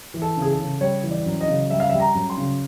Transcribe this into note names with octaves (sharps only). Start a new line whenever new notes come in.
E3
A4
C#3
G#4
A4
C#3
G3 C#5
E3
D5
F#2
D#5
C#3
G3 E5
F5
E5
G3
A#5
F#2
C6
C#3